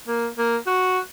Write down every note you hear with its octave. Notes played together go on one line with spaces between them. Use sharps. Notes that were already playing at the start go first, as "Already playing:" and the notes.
A#3
A#3
F#4